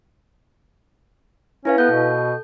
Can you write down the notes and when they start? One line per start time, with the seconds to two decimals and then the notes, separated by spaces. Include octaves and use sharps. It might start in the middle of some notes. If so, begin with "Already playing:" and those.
1.65 C#4 E4 B4 F5
1.78 B3 A4 G6
1.91 B2